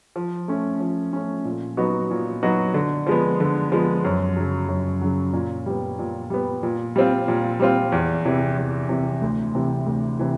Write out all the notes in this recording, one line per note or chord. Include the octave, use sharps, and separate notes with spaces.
F3
A3 C#4
F3
A3 C#4
A#2
F#3 B3 D#4 F#4
A#2
F#3 B3 D#4 F#4
D3
F3 G#3 B3
D3
F3 G#3 B3
F#2
C#3 F#3
F#2
C#3 F#3
A#2
G3 B3
A#2
G3 B3
A#2
G3 C4 F4
A#2
G3 C4 F4
E2
C3 E3
E2
C3 E3
D2
C3 E3
D2
C3 E3